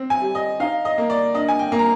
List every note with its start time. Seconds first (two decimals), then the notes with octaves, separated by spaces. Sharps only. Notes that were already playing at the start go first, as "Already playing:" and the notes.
Already playing: C4
0.10 G#5
0.22 G3
0.35 D#5
0.60 D#4 F5
0.85 D#5
0.98 A#3
1.10 D5
1.34 D4 D#5
1.49 G#5
1.59 G5
1.72 A#3
1.79 A#5